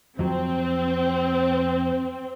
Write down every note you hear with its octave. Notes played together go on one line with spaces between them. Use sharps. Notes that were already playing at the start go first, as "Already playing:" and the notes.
F2 F#3 C4